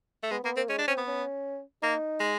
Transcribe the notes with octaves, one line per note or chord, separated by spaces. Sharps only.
A3
G#3 B3
A#3 B3
A#3 C4
G#3 C#4
D4
C4 C#4
B3
C#4
A#3 D#4
G#3